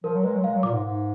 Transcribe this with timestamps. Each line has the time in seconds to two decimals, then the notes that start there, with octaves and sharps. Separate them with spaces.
0.04 F3 A#4
0.14 F#3
0.23 G#3 B4
0.34 F#3
0.44 G#3 F5
0.54 F#3
0.63 A#2 D6
0.73 G#2
0.84 G#2